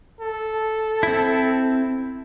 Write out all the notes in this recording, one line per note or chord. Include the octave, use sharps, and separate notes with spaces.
A4
C4 E4